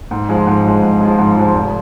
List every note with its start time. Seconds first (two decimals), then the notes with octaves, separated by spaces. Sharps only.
0.11 G#2
0.29 F3 G#3
0.47 G#2
0.65 F3 G#3
0.83 G#2
1.01 F3 G#3
1.19 G#2
1.37 F3 G#3
1.54 F1